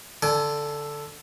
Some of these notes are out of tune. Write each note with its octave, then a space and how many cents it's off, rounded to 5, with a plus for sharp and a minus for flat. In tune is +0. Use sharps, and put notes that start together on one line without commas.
D3 +0 G#5 +40